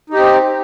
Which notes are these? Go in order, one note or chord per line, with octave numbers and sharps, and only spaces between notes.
C4 D#4 G4